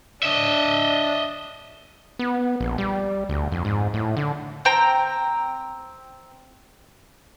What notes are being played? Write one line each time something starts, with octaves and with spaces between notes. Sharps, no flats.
D4 D#5 E5
B3
A#1
G3
D2
F2
G#2
A2
D3
C4 G5 A#5